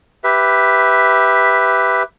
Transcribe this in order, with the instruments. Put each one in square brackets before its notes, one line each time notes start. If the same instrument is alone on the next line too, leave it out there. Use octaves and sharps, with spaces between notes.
[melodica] G4 B4 E5